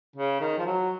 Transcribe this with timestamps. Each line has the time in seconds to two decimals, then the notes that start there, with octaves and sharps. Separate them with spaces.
0.16 C#3
0.41 D#3
0.59 F3
0.66 F#3